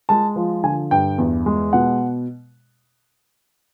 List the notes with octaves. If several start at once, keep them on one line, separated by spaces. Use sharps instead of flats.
G#3 A5
F3
D3 G#5
G2 G5
E2
G#3
B2 F#5